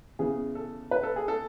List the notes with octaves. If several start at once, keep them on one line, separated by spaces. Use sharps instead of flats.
C#3 E3 B3 G#4
A4
B4
A4
G#4
A4